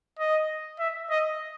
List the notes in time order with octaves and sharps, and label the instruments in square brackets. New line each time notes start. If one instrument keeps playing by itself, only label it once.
[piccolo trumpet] D#5
E5
D#5